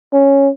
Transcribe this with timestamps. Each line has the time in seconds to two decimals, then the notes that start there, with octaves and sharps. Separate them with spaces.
0.13 C#4